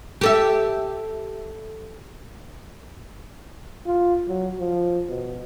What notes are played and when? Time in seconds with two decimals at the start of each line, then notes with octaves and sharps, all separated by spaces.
0.21 G4 A4 E5
3.87 F4
4.28 F#3
4.59 F3
5.09 B2